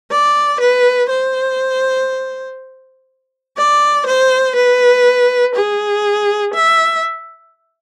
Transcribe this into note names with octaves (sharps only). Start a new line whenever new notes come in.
D5
B4
C5
D5
C5
B4
G#4
E5